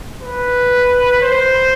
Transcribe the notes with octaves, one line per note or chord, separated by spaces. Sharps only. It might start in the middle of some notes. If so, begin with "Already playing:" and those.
B4
C5